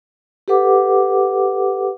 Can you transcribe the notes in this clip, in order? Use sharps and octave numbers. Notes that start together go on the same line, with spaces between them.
G4 A4 B4 F#5 D6